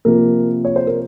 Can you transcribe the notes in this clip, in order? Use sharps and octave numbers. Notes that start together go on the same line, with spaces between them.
C3 F3 A#3 A#4
C#5
C5
A#4